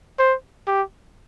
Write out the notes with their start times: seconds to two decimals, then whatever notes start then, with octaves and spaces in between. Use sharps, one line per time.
0.19 C5
0.67 G4